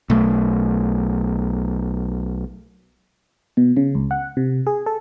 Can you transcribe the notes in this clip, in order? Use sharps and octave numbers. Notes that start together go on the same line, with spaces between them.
B1 A3
B2
C#3
C#2
F#5
C3
G#4
A4